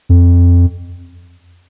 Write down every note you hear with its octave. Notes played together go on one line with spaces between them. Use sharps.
F2